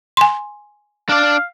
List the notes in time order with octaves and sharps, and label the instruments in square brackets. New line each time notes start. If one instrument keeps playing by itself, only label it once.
[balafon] G#5 C6
[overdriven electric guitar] D4 D5 [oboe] F5